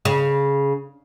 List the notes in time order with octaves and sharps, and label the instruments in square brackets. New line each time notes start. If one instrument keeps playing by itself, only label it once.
[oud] C#3